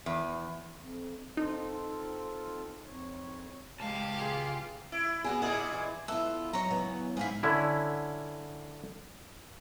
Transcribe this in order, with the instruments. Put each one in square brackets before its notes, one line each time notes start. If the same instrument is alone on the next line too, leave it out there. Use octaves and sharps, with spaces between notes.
[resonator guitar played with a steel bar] E2
[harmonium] F2
[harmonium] C4 F4 A4 [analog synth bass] D#4
[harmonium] F2 C#5
[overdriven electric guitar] C#2 A5 [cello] G#3 [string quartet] G4 F5
[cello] F4 [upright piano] G#4
[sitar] E4
[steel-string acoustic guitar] B3 F#4 G#4
[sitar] A#2 G#4 [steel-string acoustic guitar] E4 D#5
[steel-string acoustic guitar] E3
[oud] E2 B4 E5 [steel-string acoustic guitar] B3 F4 [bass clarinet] E4 [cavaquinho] A4
[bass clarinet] F#3 [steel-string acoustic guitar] D#4 F#4 [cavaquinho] C#5 A#5
[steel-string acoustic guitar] C#3 E3 B3
[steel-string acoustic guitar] G#2 F5 [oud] F3 [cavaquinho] E4 G#4
[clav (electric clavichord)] D3 C#4 E4